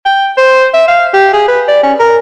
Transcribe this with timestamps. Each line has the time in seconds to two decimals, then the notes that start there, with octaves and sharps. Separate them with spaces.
0.06 G5
0.37 C5
0.74 E5
0.88 F5
1.14 G4
1.33 G#4
1.48 B4
1.68 D5
1.83 C#4
1.99 A#4